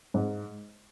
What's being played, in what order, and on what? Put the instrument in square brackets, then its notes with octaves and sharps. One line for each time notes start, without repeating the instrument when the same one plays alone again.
[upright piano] G#2